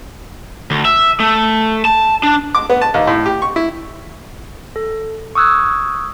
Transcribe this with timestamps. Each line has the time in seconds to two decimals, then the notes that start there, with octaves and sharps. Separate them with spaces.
0.71 D2
0.85 E5
1.20 A3
1.85 A5
2.23 D4
2.55 D6
2.70 B3
2.81 A5
2.94 D#2
3.07 A2
3.26 G4
3.42 C#6
3.56 E4
4.76 A4
5.35 C#6 D#6 E6 F#6 G#6